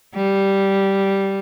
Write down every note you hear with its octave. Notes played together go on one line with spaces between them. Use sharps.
G3